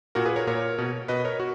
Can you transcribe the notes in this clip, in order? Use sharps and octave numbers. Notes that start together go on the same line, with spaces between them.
A#2 F#4 A#4
G#4 B4
A#4 C#5
A#2 A#4 C#5
B2
B2 B4 D#5
A#4 C#5
F#4